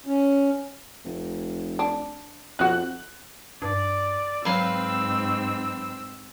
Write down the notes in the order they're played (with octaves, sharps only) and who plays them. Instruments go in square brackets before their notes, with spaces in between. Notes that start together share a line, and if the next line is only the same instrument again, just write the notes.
[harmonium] C#4
[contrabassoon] F1
[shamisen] D4
[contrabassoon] F2 [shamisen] D#4 F#4 [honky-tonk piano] F#6
[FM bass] G2 [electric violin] D5
[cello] G#2 [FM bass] F#3 [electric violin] C4 E6 [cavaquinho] B4 F5